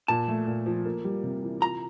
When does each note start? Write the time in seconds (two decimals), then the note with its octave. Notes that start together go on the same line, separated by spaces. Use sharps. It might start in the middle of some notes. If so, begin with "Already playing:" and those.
0.08 A#2 A5
0.28 A3
0.47 A#2
0.66 F3
0.85 A#3
1.04 G3
1.23 C3
1.43 E3
1.62 F4 A#5